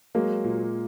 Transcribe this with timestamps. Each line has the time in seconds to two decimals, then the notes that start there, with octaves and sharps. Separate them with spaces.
0.15 F#3 G#3 A#3
0.44 A#2